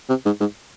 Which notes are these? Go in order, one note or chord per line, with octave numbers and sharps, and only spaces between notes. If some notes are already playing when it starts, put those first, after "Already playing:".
C3
G#2
G#2